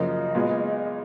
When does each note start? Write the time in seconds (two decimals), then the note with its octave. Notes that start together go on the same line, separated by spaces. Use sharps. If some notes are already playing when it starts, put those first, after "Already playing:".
Already playing: F#2 C#3 F3 A#3 D#5
0.35 A#2 G#3 B3